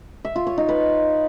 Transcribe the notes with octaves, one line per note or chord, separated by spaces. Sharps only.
E5
F4
C#5
D#4
B4